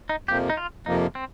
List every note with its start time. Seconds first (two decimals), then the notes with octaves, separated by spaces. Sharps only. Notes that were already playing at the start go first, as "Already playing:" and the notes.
0.09 D#4
0.28 F2 C3 F3 A#3 G4
0.50 D#4
0.57 F4
0.86 F2 C3 F3 A#3 D#4
1.15 C4